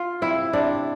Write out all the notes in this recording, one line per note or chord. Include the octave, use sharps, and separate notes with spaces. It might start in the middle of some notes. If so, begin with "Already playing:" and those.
Already playing: F4
C3 E4
C3 D4